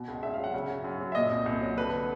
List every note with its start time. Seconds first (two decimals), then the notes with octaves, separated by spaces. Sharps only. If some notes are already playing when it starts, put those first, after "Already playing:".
Already playing: B2
0.08 C#2
0.23 C#2 E5
0.34 F5
0.38 F#3
0.44 F#5
0.54 C#3
0.69 F#2
0.84 F#2
1.01 F#3
1.12 E5
1.15 A#2 D#5
1.30 C2
1.46 C2
1.61 F#3
1.77 D3 B4